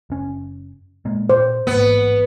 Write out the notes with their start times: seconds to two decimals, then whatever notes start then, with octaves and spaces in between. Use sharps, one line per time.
0.10 F#1 C#4
1.05 A#2 G#3 A#3
1.29 A#2 C5
1.67 A1 G#2 A#3 B3